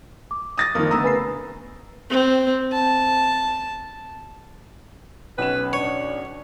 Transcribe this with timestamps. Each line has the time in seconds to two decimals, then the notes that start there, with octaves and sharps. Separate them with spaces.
0.31 D6
0.58 D#6 A6 A#6
0.75 F2 D#3 A#3 A#4 D#6
0.91 D3 A3 B3 A#5 D#6 E6
1.04 C#3 B4 G#5 B5 C7
2.10 C4
2.72 A5
5.38 B1 C#4 B4 E7
5.73 D4 C#5